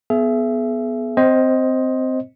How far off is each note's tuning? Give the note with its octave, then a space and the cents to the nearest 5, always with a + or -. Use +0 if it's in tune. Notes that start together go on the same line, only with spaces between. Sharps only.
B3 +0 G#4 +35 E5 +25
C4 -15 C5 +10 D#5 +10